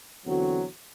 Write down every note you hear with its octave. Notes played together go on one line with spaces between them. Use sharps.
E2 D3 F#3 C4 F#4